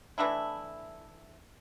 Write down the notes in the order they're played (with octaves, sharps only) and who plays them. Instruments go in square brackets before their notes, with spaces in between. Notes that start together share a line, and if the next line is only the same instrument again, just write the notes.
[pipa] E3 A3 D4 E4